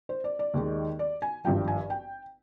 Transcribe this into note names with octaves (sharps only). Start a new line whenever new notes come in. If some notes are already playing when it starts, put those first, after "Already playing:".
C5
D5
D5
D#2 D#3 G#3 D#4
D5
G#5
G#1 G2 F3 G5
G#5
G5